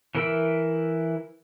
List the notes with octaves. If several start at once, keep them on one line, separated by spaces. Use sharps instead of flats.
E3 E4 A#4 B5 E6